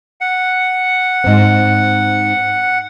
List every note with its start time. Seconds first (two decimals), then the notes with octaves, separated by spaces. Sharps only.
0.21 F#5
1.24 G#2 C4